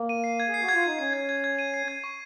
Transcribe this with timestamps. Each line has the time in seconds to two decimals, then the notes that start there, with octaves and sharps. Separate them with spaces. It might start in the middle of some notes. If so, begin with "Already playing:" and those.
Already playing: A#3
0.09 D#7
0.24 C7
0.40 G#6
0.48 G#4
0.54 C7
0.61 F#4
0.69 G#6
0.74 F4
0.84 D#4 C7
0.99 C#4 C7
1.13 G#6
1.29 G#6
1.44 G#6
1.59 D#7
1.74 C7
1.88 G#6
2.04 C#6